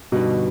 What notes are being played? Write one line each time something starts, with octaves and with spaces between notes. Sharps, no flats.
G2 B2 D3 G3 B3 D#4